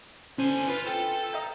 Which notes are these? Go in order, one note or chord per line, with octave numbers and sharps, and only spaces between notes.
D3 C#4 C5 G#5
F4 B4
A4 G5
D#5 E5 G5 A#5